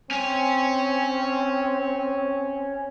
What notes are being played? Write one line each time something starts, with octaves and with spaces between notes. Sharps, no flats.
C4 C#4